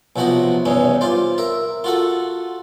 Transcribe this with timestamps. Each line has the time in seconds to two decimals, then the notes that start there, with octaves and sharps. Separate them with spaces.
0.16 B1 C3 F3 F#4 D#5
0.65 E2 G2 C3 C#4 D#4
1.01 F4 C5 D5
1.38 A#4 E5
1.84 F4 F#4 A4